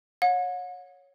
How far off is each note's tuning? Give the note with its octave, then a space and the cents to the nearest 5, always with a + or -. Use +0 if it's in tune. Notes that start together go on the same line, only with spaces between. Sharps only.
C#5 +0 F#5 -40